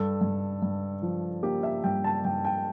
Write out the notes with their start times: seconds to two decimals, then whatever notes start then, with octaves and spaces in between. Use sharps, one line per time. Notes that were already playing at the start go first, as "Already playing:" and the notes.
Already playing: G2 A4
0.21 G2
0.62 G2
1.02 F3
1.43 A#3 G4
1.63 E5
1.84 G2 G5
2.04 A5
2.25 G2 G5
2.45 G5